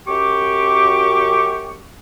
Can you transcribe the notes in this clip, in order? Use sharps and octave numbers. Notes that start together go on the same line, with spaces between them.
F#2 G4 C#6 D6